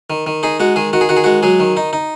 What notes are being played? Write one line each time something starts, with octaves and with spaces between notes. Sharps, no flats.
D#3
D#3
D#4 G#4
G#3 F#4
D#3 G#4
D#3 F#4
G#4
D#3 F#4
G#4
G#3 F#4
F#3 G#4
D#3
D#4
D#4